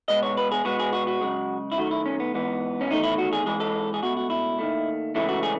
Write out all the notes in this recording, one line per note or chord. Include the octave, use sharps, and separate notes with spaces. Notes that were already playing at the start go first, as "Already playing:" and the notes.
B2 G#3 B3 D#5
C#5
B4
G#4
B2 G#3 B3 F#4
G#4
F#4
F#4
F#2 C#3 G#3
E4
F#2 D#3 A3 F#4
E4
C#4
B3
G#2 E3 B3
C#4
E2 D#3 A3 D#4
E4
F#4
G#4
G#2 E3 G#3 G#4
A4
G#4
C#2 B2 A3 F#4
F#4
E4
D#2 D#3 A3
C#2 C#3 E3 A3 E4
F#4
G#4